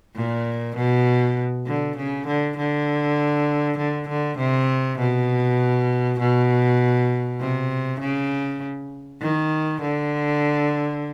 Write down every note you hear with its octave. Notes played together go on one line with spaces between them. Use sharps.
A#2
B2
D3
C#3
D3
D3
D3
D3
C3
B2
B2
C3
C#3
D#3
D3